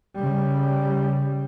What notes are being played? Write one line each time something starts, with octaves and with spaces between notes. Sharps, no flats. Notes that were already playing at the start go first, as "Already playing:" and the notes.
C#3 G3